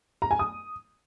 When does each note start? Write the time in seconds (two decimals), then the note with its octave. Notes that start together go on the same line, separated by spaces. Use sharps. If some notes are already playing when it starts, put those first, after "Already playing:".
0.22 A#5
0.31 G#5
0.39 D#6